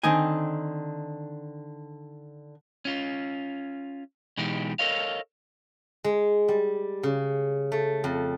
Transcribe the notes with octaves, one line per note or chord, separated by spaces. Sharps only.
D3 D#3 C4 D#4 G#5
C#4 F4
B2 E3 G#3 D#4 G4
A4 A#4 C#5 D#5 F5
G#3
G3
C#3
A3
F2